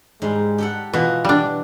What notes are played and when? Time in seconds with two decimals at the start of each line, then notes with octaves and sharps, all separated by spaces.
0.22 G#2 G3 G#3
0.58 G4 A4 F#5
0.93 B2 E3 F4 F#4 D#5
1.25 G3 D4